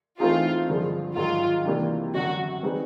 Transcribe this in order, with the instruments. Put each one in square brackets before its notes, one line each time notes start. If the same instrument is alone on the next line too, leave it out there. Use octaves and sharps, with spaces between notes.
[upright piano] E3 A3 C4 D#4 G#4 [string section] F4
[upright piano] G2 D3 F3 G#3
[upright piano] G#2 D#3 F#3 [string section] F4
[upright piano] C3 E3 G3 A#3 D4
[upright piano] F#2 D3 F#3 [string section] F#4
[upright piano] G3 C4 D#4 G#4 B4